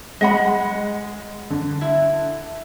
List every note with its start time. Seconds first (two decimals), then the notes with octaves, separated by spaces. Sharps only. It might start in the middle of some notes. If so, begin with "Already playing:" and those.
0.21 G#3 D#5 F#5 B5
1.50 D3
1.81 E4